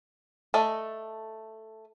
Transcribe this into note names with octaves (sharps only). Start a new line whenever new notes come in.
A3 A4 D5 D#5